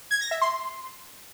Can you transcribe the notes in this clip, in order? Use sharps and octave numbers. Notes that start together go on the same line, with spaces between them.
G#6
A#6
E5
C6